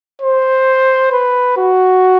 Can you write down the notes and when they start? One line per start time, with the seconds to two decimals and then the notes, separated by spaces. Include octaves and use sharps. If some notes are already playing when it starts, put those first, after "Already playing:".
0.22 C5
1.13 B4
1.57 F#4